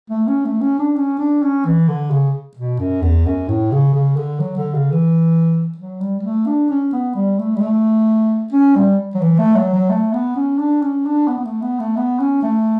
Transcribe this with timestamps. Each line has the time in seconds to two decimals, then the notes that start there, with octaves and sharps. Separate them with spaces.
0.10 A3
0.27 C#4
0.45 A3
0.61 C#4
0.79 D4
0.96 C#4
1.19 D4
1.42 C#4
1.65 E3
1.88 D3
2.11 C#3
2.57 B2
2.79 F#2
3.02 E2
3.26 F#2
3.48 A2
3.72 C#3
3.94 C#3
4.17 D3
4.40 F#3
4.57 D3
4.74 C#3
4.92 E3
5.77 F#3
6.00 G3
6.20 G3
6.23 A3
6.46 D4
6.70 C#4
6.93 B3
7.15 G3
7.39 A3
7.56 G3
7.61 A3
8.53 C#4
8.75 G3
9.15 F#3
9.22 E3
9.39 A3
9.56 F#3
9.74 F#3
9.90 A3
10.13 B3
10.36 C#4
10.59 D4
10.82 C#4
11.05 D4
11.28 B3
11.38 B3
11.45 A3
11.62 B3
11.80 A3
11.97 B3
12.20 C#4
12.42 A3